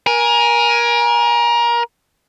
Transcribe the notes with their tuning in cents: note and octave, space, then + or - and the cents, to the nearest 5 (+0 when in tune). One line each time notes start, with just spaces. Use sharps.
A#4 +25 G#5 +0